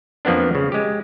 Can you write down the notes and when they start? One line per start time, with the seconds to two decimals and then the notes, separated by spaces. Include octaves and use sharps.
0.25 F2 F3 A#3 B3 D4
0.55 C#3
0.72 G#3 G4